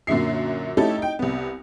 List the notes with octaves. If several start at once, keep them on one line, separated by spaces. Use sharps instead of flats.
F#2 A#2 D3 E5 C7
A3 C#4 D#4 E4 G4 A4
D#4 G5
C2 B3